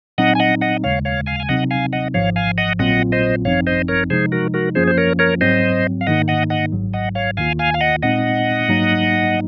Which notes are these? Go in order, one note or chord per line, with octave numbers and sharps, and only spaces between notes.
A#2 F#3 C4 D#4 D#5 F#5
G#5
D#5 F#5
D#5 F#5
D#2 C#3 G#3 C#5 F5
C#5 F5
F5 G#5
G#5
C3 F#3 C4 D#4 D#5 F#5
F5 G#5
D#5 F#5
G#1 G#2 F3 C#5 F5
F5 G#5
D#5 F#5
A#1 A#2 F#3 C4 F4 D#5 F#5
C5 D#5
G#1 F#2 F3 C4 D#4 C#5 F5
C5 D#5
A#4 C#5
C3 F3 G#3 D#4 G#4 C5
F#4 A#4
F#4 A#4
F#2 F3 A#3 C#4 F4 G#4 C5
C5
A#4 C#5
A#4 C#5
G#2 F#3 C4 C5 D#5
F5
G#2 D#3 A#3 D#4 D#5 F#5
D#5 F#5
D#5 F#5
G#1 G#2 F#3
D#5 F#5
C#5 F5
D#2 D#3 A#3 F4 F5 G#5
F5 G#5
F5
D#5 F#5
A#2 G#3 C4 D#4 D#5 F#5
G#2 F#3 A#3 D#4